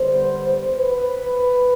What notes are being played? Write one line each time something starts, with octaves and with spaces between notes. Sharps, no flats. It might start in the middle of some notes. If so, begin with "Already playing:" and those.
Already playing: D3 G3 B3 C5
B4